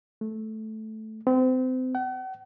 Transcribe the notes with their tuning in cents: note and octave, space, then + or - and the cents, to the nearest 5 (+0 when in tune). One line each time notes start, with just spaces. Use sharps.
A3 -10
C4 -30
F#5 +45